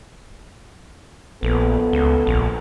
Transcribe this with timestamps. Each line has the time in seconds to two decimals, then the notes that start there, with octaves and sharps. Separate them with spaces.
1.43 A#1 B3 A4
1.93 C#2
2.27 A#1